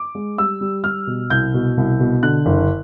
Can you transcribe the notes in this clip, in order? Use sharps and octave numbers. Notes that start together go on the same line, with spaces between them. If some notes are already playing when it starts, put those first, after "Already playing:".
Already playing: D6
G#3
G3 E6
G3
G3 F6
B2
C2 G6
B2
C2
B2
D3 F#6
F#1